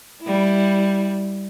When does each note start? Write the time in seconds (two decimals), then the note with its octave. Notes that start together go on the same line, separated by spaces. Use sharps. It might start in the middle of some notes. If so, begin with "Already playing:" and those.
0.23 G3 E4